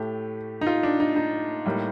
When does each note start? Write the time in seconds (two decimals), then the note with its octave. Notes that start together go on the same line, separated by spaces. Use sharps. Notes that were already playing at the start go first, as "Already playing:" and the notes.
Already playing: A2 A3 G4
0.61 D#4
0.67 F4
0.83 D4
1.00 D#4
1.16 D#4
1.66 A2 G3 A#3